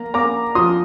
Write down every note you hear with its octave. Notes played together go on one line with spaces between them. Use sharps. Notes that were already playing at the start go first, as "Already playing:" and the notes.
Already playing: A#3 A#5
A#3 A#5 D6
F3 C6 D#6